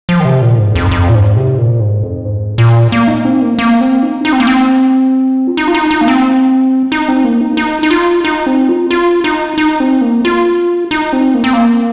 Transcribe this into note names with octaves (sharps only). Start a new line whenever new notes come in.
F3
D#3
C3
A#2
G#2
F2
F2
A#2
G#2
C3
A#2
G#2
F2
G#2
A#2
A#3
D#4
C4
A#3
A#3
C4
D#4
D#4
C4
A#3
C4
F4
D#4
F4
D#4
D#4
A#3
C4
D#4
C4
A#3
D#4
D#4
D#4
F4
D#4
C4
F4
F4
D#4
D#4
C4
A#3
F4
D#4
C4
A#3
C4
A#3